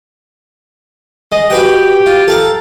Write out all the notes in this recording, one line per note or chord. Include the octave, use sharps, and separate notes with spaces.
G#3 D#5
F#4 G4 B4 F#5
F4
A4 F5 A#5